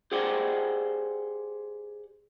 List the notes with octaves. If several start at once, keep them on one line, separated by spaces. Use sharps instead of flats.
G4 G#4 C5 D5 F#5 G5